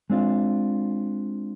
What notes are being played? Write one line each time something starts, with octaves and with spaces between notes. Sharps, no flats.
G#3 C4 D4 F4